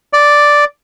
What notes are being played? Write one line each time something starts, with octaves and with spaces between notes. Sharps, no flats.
D5